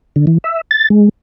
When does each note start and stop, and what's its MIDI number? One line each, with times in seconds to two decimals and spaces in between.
0.16 0.25 50
0.27 0.38 52
0.44 0.61 76
0.71 0.88 93
0.90 1.09 56